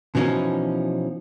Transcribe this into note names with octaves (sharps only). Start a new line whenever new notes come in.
B2 E3 F3 C#4 D#4